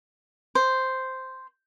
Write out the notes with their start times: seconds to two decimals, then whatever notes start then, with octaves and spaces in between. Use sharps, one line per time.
0.55 C5